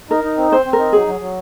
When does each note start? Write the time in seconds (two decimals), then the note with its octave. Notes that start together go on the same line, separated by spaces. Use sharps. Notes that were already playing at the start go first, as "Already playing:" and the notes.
0.11 D#4 A#4
0.24 D#4
0.37 C4
0.51 C4 C5
0.66 C4
0.73 A#4
0.79 D#4
0.93 F#3 G#4
1.07 F#3
1.20 F#3